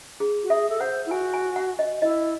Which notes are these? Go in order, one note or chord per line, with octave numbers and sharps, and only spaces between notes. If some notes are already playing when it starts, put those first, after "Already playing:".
G#4
F#4
G#4 E5
A4
C5 F#5
E4
F#4 G#5
G#5
F#5
D#5
E4 D#5